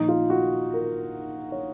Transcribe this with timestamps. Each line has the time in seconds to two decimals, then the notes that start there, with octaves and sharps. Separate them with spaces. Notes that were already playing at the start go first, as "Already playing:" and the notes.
Already playing: A#1 A#2 D#4
0.08 F4
0.30 F#4
0.74 A#4
1.52 C#5